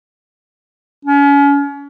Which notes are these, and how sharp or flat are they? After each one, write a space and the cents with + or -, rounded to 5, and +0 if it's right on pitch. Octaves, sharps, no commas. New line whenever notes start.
C#4 +35